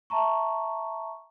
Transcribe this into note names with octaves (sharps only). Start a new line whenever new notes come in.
E5 A5 A#5 C#6